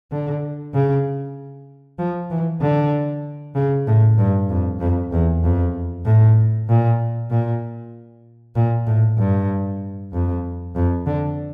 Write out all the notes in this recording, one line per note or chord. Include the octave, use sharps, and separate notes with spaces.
D3
C#3
F3
E3
D3
C#3
A2
G2
F2
F2
E2
F2
A2
A#2
A#2
A#2
A2
G2
F2
F2
D3